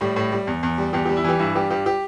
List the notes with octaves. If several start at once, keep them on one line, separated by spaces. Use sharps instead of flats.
A2 G3
A2
G3
E2
E2
G3
E2 G4
G3 G4
E4
E3 G4
G2 E4
G3 G4
G2 G4
G4